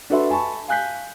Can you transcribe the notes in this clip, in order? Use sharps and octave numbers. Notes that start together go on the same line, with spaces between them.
D4 F#4 A4 B4 E5 C6
G#5 A5 B5 C#6
F5 G#5 F#6 G6 B6